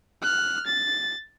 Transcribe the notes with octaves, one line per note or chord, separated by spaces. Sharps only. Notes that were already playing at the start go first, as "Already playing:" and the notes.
F6 F#6
A6